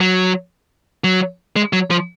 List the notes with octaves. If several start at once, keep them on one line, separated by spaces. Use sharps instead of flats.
F#3
F#3
G#3
F#3
F3